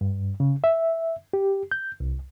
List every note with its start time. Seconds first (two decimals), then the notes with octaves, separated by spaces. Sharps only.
0.01 G2
0.40 C#3
0.64 E5
1.33 G4
1.72 G6
2.00 C2